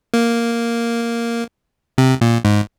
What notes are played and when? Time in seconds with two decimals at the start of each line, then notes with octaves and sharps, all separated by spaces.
0.14 A#3
1.98 C3
2.21 A#2
2.45 G#2